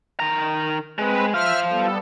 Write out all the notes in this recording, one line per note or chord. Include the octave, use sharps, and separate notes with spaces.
D#3 A#5
G#3 C4 B4
F4 C5 E5 F6
G3 B3 A4